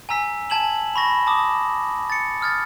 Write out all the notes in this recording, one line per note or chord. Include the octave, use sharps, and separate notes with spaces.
G#5 A#5 E6 B6
G#5 A5 G#6 E7 F#7
B5 C#6 A#6
A5 D6 D#6
A6 C#7
D#6 F6 G#6 A6